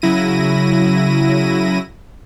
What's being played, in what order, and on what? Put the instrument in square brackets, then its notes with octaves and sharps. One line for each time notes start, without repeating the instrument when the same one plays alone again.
[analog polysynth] C#3 F#3 E4 A#6 D#7